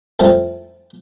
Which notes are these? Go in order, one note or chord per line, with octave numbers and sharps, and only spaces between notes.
F2 F3 G3 A3 E4